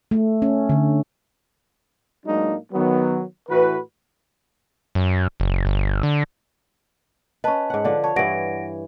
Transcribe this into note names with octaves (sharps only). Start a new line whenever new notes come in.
A3
C#4
D3
A2 F#3 G#3 A#3 D4 D#4
D#3 F#3 B3
A2 E3 F#4 B4
F#2
F#1
G1
D3
C#4 B4 D#5 A5
G#2 F#5
D3 F3 D4
C#5 A5
G2 E3 F#5 A#6 D7